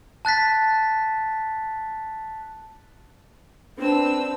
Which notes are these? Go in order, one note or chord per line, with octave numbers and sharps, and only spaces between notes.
A5 F#6 A6 B6
C4 D4 B4 E6